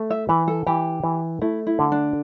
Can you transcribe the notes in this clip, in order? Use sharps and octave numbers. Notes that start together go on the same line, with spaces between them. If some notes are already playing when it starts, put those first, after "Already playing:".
Already playing: A3
E5
E3 B4
A4
E3 G4
E3
A3 E4
E4
D3
D4